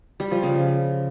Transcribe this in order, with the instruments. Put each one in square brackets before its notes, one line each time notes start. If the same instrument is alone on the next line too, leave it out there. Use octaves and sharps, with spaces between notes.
[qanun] G3
F3
C#3